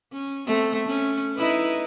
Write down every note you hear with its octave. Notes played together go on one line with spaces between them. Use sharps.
C#4
A3 C4
C#4
D#4 E4 B4